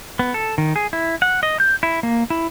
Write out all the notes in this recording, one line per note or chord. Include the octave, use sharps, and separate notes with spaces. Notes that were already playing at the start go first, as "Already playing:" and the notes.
B3
A4
D#3
G#4
E4
F#5
D#5
G6
E4
A#3
E4